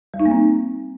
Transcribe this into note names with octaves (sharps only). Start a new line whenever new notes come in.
G3
D#4
A#3
C4